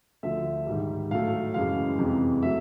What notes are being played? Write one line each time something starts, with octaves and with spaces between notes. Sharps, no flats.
D2 D3 F3 A3 E5
G#2 D#3 G3
A2 F#3 A3 F5
F#2 C#3 E3 G#3 F5
F2 C3 E3 G#3
F#3 A3 E5